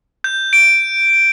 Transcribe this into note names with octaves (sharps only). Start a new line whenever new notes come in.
G6
D7